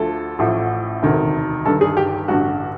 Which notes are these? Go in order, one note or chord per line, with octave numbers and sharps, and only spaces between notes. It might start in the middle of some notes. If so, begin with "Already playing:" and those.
Already playing: D2 D3 F3 A3 A4
A1 A2 F3
E1 D2 C3 D#3
G1 G2 D#3 A4
G#4
G4
G4
A1 G2 D3 F#4